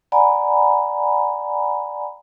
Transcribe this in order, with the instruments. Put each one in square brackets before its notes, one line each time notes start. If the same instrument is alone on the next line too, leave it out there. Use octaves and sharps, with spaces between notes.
[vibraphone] D5 F#5 G#5 A#5 B5